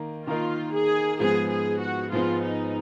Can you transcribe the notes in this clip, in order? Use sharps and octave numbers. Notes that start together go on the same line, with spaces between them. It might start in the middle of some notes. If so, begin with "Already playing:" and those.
Already playing: D#3 A#3 D#4
D#3 A#3 D#4 F4 A#4
G#4
G#2 F3 G#3 B3 G#4
G#4
F#4
G#2 F3 G#3 B3 F4
D#4